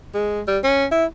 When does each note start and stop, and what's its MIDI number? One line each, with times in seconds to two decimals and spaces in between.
0.14 0.41 56
0.48 0.59 55
0.64 0.86 61
0.92 1.05 64